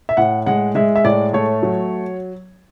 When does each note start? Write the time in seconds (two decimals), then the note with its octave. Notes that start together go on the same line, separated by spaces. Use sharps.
0.09 E5
0.17 A2 F#5
0.46 G#3 F#5
0.75 G#3 E5
0.96 E5
1.04 A2 D5
1.33 A3 C#5
1.63 F#3